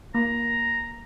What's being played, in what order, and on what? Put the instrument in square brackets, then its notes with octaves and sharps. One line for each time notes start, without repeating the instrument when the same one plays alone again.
[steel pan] A#3 [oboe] A#5